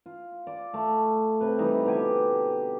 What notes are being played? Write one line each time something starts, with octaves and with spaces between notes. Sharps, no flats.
F4
D5
A3
C3 B4
E3 G3 D#4
B2 D3 G4 G#5